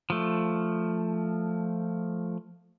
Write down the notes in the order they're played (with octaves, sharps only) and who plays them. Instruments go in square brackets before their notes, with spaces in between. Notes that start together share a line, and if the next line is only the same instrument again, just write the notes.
[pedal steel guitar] F3 A3